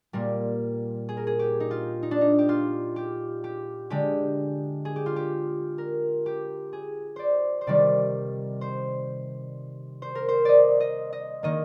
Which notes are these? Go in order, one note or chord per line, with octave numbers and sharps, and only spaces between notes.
A#2 G3 A#3 A#4
G#4
A#4
G#4
G4
D#4
F4
D#4
D4
D#4
G4
F4
G4
G4
D3 G#3 G4
G#4
G4
F4
G4
A#4
G4
G#4
C5 D5
C5
C3 D#3 G3 D5
C5
C5
A#4
C5
D5 D#5
D#5
D#5
D#3 A#3 D#5